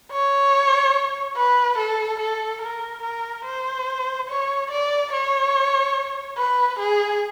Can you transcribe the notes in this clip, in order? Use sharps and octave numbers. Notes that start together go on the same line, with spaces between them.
C#5
B4
A4
A4
A#4
A#4
C5
C#5
D5
C#5
B4
G#4